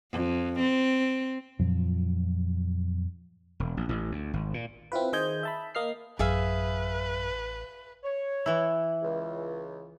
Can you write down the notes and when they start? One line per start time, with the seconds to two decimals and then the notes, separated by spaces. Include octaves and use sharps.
0.11 F2
0.59 C4
1.59 F2 A#2 F3 F#3
3.60 E1
3.77 A#1
3.89 A1
4.12 D2
4.33 G#1
4.54 A#2
4.92 C4 E4 F4 B4
5.13 D#3 G#4 C5 D#5 G#5 G6
5.43 E5 A5 B5
5.75 A#3 D#5 F6 C7
6.19 A1 F#2 G#4 B4 E5 F5
8.04 C#5
8.46 E3 E4
9.02 C#2